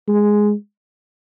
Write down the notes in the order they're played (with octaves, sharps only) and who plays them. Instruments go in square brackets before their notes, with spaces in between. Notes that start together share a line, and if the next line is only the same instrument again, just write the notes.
[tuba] G#3